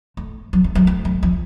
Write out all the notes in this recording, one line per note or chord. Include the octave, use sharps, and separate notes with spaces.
A3
F#3
A3
F#3
A3
A3
F3